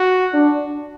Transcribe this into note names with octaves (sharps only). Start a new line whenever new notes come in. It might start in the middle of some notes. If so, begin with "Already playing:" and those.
Already playing: F#4
D4